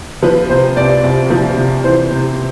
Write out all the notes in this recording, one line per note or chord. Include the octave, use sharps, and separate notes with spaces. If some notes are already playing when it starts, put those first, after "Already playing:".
F3 B4
C3 C5
C2 D5
C2
F3
C3
E3 C5
C3